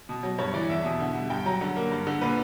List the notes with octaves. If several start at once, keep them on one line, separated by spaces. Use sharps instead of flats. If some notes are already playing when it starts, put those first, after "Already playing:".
B2
F#3
G2 C#5
E3 D5
E2 E5
B2
D3
G3
G2 G5
F#3 A#5
D3
A#3
G2
D3
A#2 B4